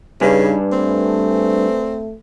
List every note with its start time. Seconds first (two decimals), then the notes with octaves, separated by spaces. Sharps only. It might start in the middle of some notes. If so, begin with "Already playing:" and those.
0.21 G2 C#3 D#4 B4 D5 G#5
0.72 A3 C4